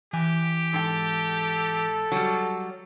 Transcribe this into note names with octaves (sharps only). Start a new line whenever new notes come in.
E3 G4 G#5
G#2 A4 G5
F#3 G3